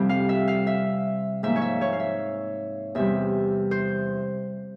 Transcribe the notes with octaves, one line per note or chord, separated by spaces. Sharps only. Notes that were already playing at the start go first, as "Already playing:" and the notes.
Already playing: F2 C3 G3 C4
F5
E5
F5
E5
G#2 F3 A#3 E5
C#5
E5
C#5
F5
E5
E2 C3 G3 E5
C5